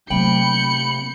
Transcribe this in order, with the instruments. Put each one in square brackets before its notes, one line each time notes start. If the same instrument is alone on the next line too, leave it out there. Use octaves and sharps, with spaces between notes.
[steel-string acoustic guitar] C3 A#3 G5 [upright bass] F#3 A3 [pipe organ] B5 [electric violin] G6 C#7